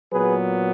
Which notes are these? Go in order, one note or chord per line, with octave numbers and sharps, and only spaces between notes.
A#2 F#3 B3 G#4 B4